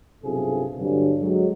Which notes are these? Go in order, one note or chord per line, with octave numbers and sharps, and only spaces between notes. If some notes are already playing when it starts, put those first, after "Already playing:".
B1 G2 C3 F4 G#4 A4
G2 D3 F#3
F#3 G#3